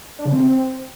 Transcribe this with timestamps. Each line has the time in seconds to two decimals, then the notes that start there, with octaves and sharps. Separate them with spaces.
0.19 D4
0.25 C#3
0.32 C4